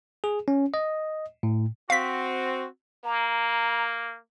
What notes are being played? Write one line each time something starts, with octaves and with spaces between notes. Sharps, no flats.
G#4
C#4
D#5
A2
C4 F#4 F5 B6
A#3 A#5